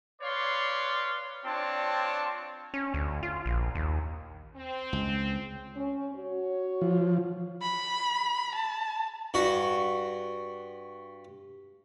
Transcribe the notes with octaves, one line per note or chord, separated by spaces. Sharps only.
B4 C#5 D5 F5 C6
C4 D4 F4 C#5 A5
C#4
D2
F4
A#1
D#2
C4
C#2
C#4
F#4 C#5
F3
B5
A5
G2 F#4